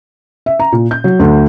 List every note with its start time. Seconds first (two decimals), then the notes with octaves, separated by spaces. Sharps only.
0.46 E5
0.60 A#5
0.72 A#2
0.91 G6
1.04 F#3
1.19 D2